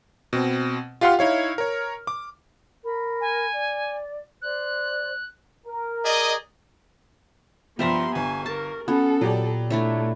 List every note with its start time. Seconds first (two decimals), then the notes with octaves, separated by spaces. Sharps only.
0.33 B2 C4
1.01 F4 G4 F5 F#5 C6 F6
1.19 D#4 E4 C#5 F5
1.58 A#4 C#5
2.07 D6
2.84 A#4 B5
3.21 G#5
3.51 D5
4.42 C5 D5 F#6
5.67 A#4
6.03 G#4 D5 D#5
7.79 G2 F3 G3 B3 G4 E5 A#5 C6
8.15 G1 G#5 C#6
8.46 A#4 A5
8.88 B3 C#4 F#4 A4
9.21 A#2 F#3 G4 D5
9.70 A3 D4 E4 C#5